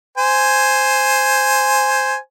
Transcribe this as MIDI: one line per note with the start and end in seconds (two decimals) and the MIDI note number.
0.17 2.17 72
0.17 2.17 80